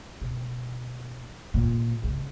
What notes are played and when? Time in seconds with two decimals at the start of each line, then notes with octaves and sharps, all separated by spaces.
0.21 B2
1.54 A#2
2.03 C#2